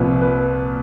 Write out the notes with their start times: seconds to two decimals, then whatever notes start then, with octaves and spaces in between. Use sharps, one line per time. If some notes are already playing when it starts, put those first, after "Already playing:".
Already playing: C2 A#2 F3 B4
0.22 B4